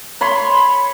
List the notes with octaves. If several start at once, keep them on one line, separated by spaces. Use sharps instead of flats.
C#5 B5 C6